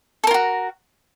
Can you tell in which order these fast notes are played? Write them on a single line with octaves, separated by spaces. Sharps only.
A4 A#4 F4 F#4